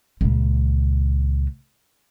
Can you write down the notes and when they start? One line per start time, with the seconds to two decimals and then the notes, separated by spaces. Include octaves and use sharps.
0.21 C#2 A#2